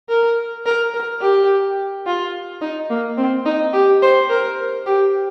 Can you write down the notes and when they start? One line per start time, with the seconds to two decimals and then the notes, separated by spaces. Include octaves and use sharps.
0.09 A#4
0.66 A#4
0.94 A#4
1.21 G4
2.06 F4
2.61 D#4
2.90 A#3
3.18 C4
3.46 D#4
3.73 G4
4.02 C5
4.30 A#4
4.86 G4